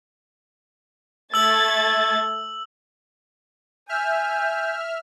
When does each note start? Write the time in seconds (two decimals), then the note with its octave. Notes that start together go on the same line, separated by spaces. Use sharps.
1.34 A3 E6 G#6 A6 F#7
3.89 E5 G#5 F6 G6